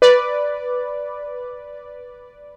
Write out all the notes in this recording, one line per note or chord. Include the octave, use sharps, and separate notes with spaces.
B4 D5